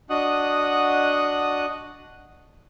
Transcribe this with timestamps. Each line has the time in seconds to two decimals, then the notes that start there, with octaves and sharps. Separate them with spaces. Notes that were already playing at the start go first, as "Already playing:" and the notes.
0.10 D4 F#4 D#5 F#5 D#6 F#6